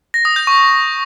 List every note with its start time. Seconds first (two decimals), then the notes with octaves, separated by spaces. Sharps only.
0.14 A#6
0.25 D#6
0.36 G6
0.47 C#6